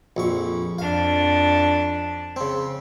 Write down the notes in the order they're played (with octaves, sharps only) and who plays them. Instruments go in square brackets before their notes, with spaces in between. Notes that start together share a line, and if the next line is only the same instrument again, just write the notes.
[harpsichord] A#1 F2 C#6
[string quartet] F2 D4 [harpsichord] F5
[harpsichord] C#3 C4